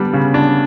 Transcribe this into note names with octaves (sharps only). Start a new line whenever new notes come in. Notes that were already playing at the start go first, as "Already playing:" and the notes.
Already playing: D3 G3 B3 D4
C#3
D4